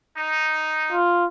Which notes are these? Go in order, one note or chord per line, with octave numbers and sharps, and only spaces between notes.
D#4
F4